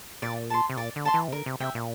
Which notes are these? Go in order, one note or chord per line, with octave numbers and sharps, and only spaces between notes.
A#2 D5
A5 C6
C3
A#2 D5
D3
A5 C6
E3
C3
D3 A#4
C3
C3 E5 G5
A#2